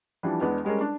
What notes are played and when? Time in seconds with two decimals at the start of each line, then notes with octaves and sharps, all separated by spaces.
0.23 E3 F3 G3 D4
0.41 E2 G#3 B3 D4
0.65 G3 G#3 C#4 G#4 A#4
0.81 D4